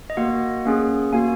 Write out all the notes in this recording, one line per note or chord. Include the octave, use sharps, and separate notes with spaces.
D#5
A#3 F#4 F#5
A#3 C#4 G#4
A#3 F#4 G#5